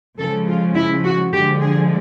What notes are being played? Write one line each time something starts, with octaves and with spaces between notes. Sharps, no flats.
C#3 F3 G#3 A4
F4
E4
F#4
D3 F3 G#3 G4
G#4